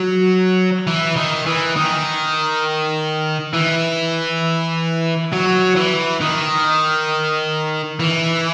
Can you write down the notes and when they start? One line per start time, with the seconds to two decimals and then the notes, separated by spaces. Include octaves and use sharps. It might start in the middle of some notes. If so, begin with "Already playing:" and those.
Already playing: F#3
0.87 E3
1.16 D#3
1.46 E3
1.76 D#3
3.54 E3
5.33 F#3
5.76 E3
6.21 D#3
8.00 E3